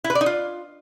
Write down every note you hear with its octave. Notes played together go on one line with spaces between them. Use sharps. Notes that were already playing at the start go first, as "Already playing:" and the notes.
E4
B4
D5
D#4
F4